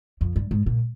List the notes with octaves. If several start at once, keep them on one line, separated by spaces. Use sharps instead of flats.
F2
G2
G#2
A#2